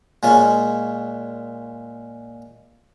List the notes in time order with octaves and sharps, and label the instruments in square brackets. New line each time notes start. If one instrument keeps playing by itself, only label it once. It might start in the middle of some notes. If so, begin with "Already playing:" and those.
[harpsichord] A#2 G#3 C#4 G#5